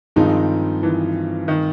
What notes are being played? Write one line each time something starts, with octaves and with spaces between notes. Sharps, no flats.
G2 D#3 F3 G#3 C4 D#4
E3
D#3